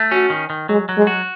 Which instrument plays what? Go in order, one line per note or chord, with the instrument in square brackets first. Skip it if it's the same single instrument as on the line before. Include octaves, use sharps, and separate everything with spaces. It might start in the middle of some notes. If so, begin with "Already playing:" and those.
Already playing: [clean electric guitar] A3
[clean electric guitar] C#4 [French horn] F#4
[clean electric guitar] D#3
D#3
[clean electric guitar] F#3 [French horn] G#3
[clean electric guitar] F#3
[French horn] G#3
[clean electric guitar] F#4